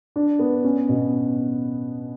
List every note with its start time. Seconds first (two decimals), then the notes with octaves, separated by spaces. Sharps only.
0.16 D4
0.39 B3
0.64 C#4
0.89 B2